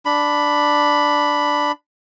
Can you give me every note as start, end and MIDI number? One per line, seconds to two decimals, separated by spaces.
0.06 1.72 62
0.06 1.72 83